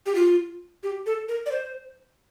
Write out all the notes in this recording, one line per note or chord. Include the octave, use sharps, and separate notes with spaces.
G4
F4
G4
A4
A#4
D5
C5